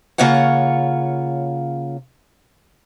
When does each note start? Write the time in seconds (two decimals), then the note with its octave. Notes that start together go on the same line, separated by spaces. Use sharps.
0.18 C#3 A#3 F4 C#5 F#5